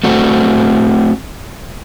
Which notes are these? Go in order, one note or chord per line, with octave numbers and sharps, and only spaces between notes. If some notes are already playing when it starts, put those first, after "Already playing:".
A3 C4 F#4